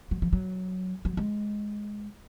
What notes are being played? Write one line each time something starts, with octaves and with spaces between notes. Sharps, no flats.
F#3
F3
F#3
F#3
G#3